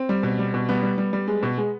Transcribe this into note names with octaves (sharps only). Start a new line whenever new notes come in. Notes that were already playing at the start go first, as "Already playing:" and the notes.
Already playing: C4
G3
B2
G3
B2
G3 B3
G3
G3
G3
G#3
B2
G#3